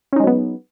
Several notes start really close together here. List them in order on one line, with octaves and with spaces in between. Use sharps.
C#4 D#4 G#3 F#3 B3